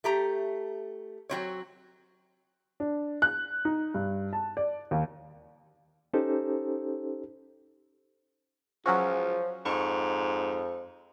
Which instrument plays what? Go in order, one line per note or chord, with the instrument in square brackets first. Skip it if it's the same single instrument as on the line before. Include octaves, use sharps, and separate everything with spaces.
[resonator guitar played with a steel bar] A3 G4 A#5
F#3 C4 C#5
[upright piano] D4
F#6
D#4
G2
A5
D5
D#2
[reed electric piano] C#4 D#4 G4 A4 C5
[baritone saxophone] C#2 [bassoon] F3 [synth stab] F#3 C#4 F#4
[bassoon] F2 [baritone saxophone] G#2 [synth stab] C#6